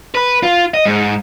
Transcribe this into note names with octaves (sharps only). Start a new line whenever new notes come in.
B4
F4
D#5
G#2